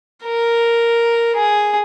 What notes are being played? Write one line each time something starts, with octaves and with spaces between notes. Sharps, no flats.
A#4
G#4